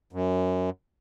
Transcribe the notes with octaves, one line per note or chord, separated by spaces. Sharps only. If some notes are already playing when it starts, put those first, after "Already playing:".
F#2